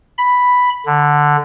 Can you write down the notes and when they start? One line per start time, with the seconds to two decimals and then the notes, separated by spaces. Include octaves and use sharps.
0.18 B5
0.86 D3